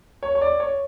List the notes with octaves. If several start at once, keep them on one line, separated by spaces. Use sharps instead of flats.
C#5
C#5
D5
C#5